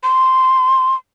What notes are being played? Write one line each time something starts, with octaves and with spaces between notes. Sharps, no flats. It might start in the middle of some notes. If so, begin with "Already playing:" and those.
C6